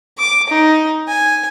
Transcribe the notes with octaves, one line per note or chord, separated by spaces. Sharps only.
D6
D#4
G#5